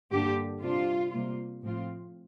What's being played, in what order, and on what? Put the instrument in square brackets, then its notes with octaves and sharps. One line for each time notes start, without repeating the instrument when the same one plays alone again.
[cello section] G2 D3 G3 A#3 D4 G4
C3 G3 D4 F4
C3 G3 A#3 F4
A2 F3 C4 F4